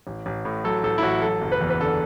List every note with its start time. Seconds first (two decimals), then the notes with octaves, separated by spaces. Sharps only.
0.07 A1
0.26 A1
0.45 A2
0.64 F#3 A4
0.84 A1 A4
0.98 E4
1.03 A1 F#4
1.22 F#3 A4
1.42 F#1
1.52 B4
1.61 E2
1.70 B4
1.80 D3 A4